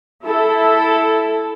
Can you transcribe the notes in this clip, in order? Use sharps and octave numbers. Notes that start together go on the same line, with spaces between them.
E4 A4